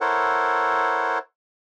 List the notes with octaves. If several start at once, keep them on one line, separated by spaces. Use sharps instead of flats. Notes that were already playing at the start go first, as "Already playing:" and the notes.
E4 A4 A#4 C5 C#5 F#5